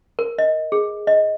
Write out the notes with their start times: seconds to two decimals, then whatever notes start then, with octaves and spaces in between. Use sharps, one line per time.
0.19 A#4
0.38 D#5
0.72 G#4
1.07 D#5